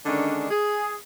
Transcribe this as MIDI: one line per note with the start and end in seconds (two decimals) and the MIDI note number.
0.06 0.47 50
0.06 0.47 51
0.06 0.47 56
0.06 0.47 61
0.06 0.47 62
0.51 0.93 68